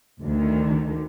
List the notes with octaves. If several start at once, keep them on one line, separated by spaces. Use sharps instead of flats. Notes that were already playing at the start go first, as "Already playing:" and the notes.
D2 D3 D#3